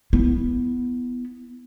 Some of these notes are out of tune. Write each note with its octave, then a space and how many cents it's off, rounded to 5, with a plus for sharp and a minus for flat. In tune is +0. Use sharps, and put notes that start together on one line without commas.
B3 +0 E4 +0